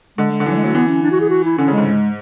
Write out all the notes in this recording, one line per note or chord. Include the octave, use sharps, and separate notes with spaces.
D3 G#3
G#3
D3
E3
F#3
G#3
F#3 A3
E3 B3
C#4
D4
F#4
G#4
F#4
E4
D3 C#4
C#3
G#3
G#2
G#3